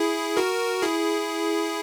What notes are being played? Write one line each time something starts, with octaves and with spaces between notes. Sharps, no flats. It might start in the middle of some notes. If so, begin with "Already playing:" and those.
Already playing: E4 G#4
F#4 A#4
E4 G#4